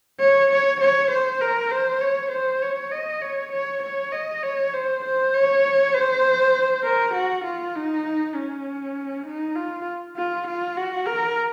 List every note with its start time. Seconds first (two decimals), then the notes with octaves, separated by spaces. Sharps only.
0.19 C#5
0.50 C#5
0.80 C#5
1.10 C5
1.41 A#4
1.71 C5
2.01 C#5
2.31 C5
2.62 C#5
2.91 D#5
3.21 C#5
3.51 C#5
3.82 C#5
4.12 D#5
4.42 C#5
4.73 C5
5.03 C5
5.34 C#5
5.94 C5
6.83 A#4
7.14 F#4
7.44 F4
7.75 D#4
8.35 C#4
9.26 D#4
9.56 F4
10.16 F4
10.47 F4
10.77 F#4
11.06 A#4